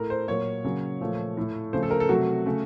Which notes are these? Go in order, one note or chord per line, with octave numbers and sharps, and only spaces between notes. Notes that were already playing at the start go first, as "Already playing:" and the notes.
Already playing: A2 A3 A#4
C5
A#2 F#3 A#3 C#5
C#3 F#3 A#3
A#2 F3 A3
A2 A3
C#3 F3 A3 C5
A4
A#4
A4
C3 F#3 A3 F#4
C#3 A3